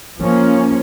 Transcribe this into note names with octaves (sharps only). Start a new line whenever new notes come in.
F3 A#3 C#4